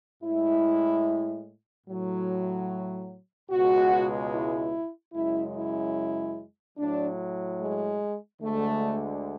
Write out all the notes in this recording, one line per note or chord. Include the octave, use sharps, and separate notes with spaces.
A2 G#3 E4
A2 F#3
C#2 B2 G#3 F#4
E4
F#2 C#3 G#3 E4
E4
A2 F#3 D4
G#3
D2 D3 G#3 A3